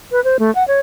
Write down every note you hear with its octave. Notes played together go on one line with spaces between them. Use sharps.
B4
C5
A3
F#5
C#5